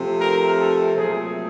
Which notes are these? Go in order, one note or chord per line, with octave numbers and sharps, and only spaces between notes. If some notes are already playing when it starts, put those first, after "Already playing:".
Already playing: C3 F3 A3 C4
A#4
A4
A#2 F#3 A3 C4 G#4